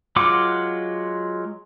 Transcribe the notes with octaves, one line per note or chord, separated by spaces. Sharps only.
F#3 G#3 F4 F#5 D6